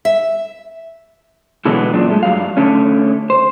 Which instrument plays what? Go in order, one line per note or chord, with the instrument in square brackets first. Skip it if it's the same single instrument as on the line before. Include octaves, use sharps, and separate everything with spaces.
[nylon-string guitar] E5
[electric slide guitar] B2 D3 E3 F#3 G#3 B3
F#2 A#2 D4
G#3 A3
G2 F#3 F5
D3 A3 C#4
C5